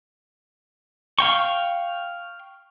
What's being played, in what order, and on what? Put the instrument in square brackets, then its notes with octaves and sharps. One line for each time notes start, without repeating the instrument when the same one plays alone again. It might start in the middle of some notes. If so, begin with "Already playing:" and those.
[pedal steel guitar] F5 G5 C#6